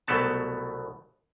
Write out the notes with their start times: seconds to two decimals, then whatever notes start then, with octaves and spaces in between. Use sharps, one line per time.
0.08 C2 B2 F#3 A3 B3 A5